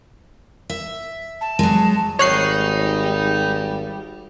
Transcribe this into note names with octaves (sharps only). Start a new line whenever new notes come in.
E5
A5
F#3 G#3
G#1 G3 D#4 C#5 F#6 C7